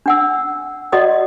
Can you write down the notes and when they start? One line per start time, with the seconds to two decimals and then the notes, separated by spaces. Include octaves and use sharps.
0.06 D4 F#5 E6
0.92 F#4 D5 D#5 F#5 D#6